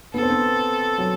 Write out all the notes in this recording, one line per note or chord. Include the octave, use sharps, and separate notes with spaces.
B3 A4
C4
B3
F#3